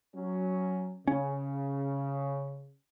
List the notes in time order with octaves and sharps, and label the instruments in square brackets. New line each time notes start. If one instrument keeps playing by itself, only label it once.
[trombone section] F#3 C#4
[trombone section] C#3 [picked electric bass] C#4